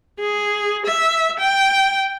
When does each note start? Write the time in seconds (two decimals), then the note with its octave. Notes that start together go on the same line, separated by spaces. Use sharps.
0.19 G#4
0.86 E5
1.39 G5